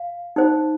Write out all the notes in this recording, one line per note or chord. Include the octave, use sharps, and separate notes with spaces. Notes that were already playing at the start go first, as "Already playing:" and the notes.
Already playing: F5
D#4 C5